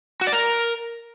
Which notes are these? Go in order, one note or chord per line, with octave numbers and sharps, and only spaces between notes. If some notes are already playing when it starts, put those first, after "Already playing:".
F#4
D5
A#4